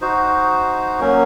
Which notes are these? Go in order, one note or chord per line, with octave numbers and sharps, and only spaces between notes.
D#4 F#4 C5
F#3 A#3 C#4